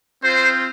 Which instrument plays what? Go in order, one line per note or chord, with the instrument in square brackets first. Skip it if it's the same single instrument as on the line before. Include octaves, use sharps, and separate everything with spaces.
[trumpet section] C4 F4 C5